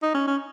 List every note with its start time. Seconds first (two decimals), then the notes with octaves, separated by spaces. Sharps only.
0.03 D#4
0.15 C#4
0.28 C#4